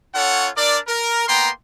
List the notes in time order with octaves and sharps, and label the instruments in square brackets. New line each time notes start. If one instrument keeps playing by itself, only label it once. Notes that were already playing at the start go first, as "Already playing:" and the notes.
[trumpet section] C#4 F4 A4 C#5 F#5
D4 A#4 D5
A#4
A#3 B3 G5 A#5 C6